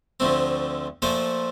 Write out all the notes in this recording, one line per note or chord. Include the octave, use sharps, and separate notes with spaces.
D2 D3 F3 A3 C4
A#2 F3 A3 A4 C5